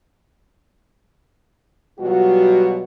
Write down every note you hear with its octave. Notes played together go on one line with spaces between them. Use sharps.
B2 F#3 G3 F4 F#4